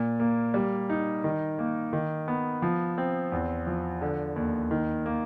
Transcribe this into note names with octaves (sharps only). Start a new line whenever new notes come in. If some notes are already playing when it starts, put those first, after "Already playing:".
Already playing: A#2
A#3
G3
D#4
D#3
A#3
D#3
B3
F3
C4
E2
F3
D3
D#2
D#3
A#3